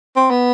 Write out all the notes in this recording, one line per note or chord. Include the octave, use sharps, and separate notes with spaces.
C4
B3